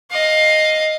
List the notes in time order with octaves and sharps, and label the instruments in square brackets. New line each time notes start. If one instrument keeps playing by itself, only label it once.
[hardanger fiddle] D#5 F5